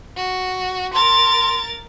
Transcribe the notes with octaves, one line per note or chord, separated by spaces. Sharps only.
F#4
A#4 C6 A6